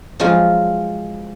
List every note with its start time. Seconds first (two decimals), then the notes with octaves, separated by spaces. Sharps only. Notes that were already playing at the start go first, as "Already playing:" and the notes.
0.20 F3 F#3 G#3 F4